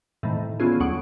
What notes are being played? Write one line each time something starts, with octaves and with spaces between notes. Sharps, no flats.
A2 C3 D#3 E3 A3
D3 A3 B3 C#4 F4 G#4
D2 F#3 C#4 F#5 D#6 D7